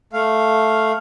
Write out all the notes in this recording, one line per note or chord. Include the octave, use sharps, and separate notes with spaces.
A3 F5